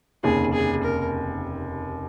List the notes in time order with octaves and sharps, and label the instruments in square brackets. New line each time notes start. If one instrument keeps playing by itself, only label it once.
[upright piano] F1 D#2 C#3 [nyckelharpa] G#4
[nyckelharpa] G#4
A#4